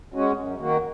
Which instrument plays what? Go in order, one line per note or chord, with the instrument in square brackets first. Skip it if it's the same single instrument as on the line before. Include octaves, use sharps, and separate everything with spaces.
[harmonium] G#3 C#4 F#4
F#2
D#3 A#3 F#4